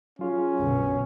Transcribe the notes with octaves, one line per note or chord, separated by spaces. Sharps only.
F#3 C#4 F4 G#4
B1 F#2 B2 D3